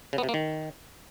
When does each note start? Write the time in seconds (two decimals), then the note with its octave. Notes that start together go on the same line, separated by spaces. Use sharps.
0.13 C#3
0.18 B3
0.23 C3
0.29 A#3
0.34 D#3